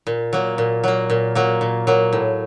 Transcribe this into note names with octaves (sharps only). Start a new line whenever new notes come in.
A#2
F#3 A#3
A#2
F#3 A#3
A#2
F#3 A#3
A#2
F#3 A#3
A2